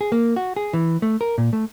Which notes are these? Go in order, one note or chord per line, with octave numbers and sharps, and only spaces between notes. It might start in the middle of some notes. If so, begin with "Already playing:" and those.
G#4
A#3
F#4
G#4
E3
A3
A#4
A#2
A3